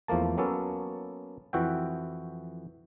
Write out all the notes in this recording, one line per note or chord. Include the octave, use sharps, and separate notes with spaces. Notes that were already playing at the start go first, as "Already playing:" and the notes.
E2 F3 A3 A#3 A5
F#3 A#3 B3 C#4 A4
F2 E3 F#4 E5 G5